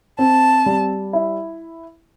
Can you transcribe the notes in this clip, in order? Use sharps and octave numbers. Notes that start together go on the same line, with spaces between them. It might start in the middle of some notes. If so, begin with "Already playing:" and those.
C4 A5
G3
E4